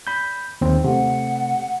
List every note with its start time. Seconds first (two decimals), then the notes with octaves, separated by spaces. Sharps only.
0.07 B5 G6
0.61 D#2 C4
0.84 C3 A3 F#5